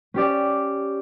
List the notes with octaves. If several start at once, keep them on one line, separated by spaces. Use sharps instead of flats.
C#4 G4 D5